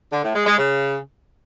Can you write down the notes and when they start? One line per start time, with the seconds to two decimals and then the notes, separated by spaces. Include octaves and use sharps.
0.12 D3
0.23 A2
0.35 G#3
0.46 G#3
0.58 C#3